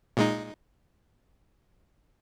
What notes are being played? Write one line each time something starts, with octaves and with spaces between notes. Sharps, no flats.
A#2 G#3 D#4